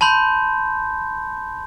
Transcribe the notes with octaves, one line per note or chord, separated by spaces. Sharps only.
A5 B5 C6 G6